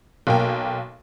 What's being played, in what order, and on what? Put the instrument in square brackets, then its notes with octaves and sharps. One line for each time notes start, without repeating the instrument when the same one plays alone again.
[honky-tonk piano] B1 A#3 G5